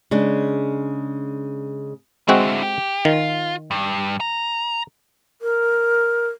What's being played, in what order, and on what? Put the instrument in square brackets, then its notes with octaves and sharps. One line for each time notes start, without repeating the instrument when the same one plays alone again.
[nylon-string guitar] C#3 G#3 D4
[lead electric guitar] D3 E4 [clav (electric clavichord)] G#3 C4 F#4
[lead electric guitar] G4
[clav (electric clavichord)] D#3 [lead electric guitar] F4
[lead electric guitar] G2
A#5
[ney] A#4